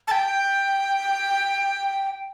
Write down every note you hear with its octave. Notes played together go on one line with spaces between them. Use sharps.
A5
G5